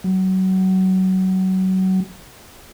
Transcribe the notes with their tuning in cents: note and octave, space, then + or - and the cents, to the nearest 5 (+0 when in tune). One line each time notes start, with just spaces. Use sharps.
F#3 +25